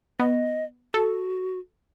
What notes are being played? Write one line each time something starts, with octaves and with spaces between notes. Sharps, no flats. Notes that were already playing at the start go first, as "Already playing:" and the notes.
B3 D#5
F#4 A4